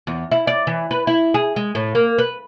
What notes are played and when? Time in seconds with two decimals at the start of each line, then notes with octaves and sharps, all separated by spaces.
0.07 E2
0.31 E4
0.47 D5
0.67 E3
0.91 B4
1.07 E4
1.34 G#4
1.56 G#3
1.75 A2
1.95 A#3
2.18 B4